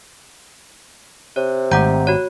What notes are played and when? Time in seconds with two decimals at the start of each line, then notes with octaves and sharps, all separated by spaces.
1.36 C3 C#5
1.72 G#1 A3 F#5 G5 A#5
2.07 F#4 C#5